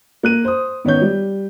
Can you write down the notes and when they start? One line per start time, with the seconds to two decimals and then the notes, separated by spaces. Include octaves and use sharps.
0.23 A#3 F#6 D#7
0.45 C5 D#6
0.85 D#3 B3 C#4 C#5 G6
1.01 G3